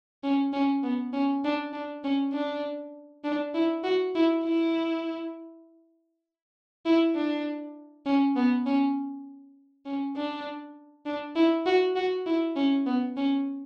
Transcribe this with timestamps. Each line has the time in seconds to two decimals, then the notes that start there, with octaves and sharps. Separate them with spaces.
0.24 C#4
0.53 C#4
0.83 B3
1.13 C#4
1.44 D4
1.73 D4
2.04 C#4
2.33 D4
3.24 D4
3.54 E4
3.84 F#4
4.15 E4
4.44 E4
6.86 E4
7.15 D4
8.06 C#4
8.36 B3
8.66 C#4
9.86 C#4
10.16 D4
11.06 D4
11.36 E4
11.66 F#4
11.96 F#4
12.26 E4
12.56 C#4
12.86 B3
13.17 C#4